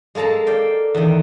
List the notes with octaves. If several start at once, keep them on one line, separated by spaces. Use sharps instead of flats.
G#3 A#3 A4 A5 A#5
D5 F5 G5
E2 D#3